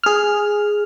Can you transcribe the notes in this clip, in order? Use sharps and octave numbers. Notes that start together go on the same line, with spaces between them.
G#4 F6